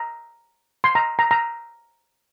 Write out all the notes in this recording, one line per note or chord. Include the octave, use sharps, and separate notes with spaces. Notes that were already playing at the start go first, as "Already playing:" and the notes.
Already playing: A#5
C6
A#5
A#5
A#5